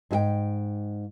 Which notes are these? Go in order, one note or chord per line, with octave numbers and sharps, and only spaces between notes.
G#2 G#4 G5